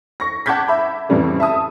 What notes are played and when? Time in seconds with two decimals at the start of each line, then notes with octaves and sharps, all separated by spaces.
0.20 C#6 A#6
0.46 F#5 A5 D6 G6 G#6 B6
0.68 E5 B5
1.09 F2 A2 C#3 E3 G3 A3
1.40 E5 A5 D#6